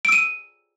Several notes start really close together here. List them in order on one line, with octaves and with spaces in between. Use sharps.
D7 E6 D#7